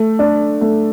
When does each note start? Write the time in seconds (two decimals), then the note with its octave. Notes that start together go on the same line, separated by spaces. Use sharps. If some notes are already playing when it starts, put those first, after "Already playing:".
Already playing: A3
0.19 D4
0.61 A3